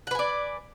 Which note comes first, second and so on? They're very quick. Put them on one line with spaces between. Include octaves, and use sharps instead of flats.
F#5 B4 G#5 D5